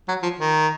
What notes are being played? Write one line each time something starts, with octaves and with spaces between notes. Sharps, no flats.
F#3
F3
D#3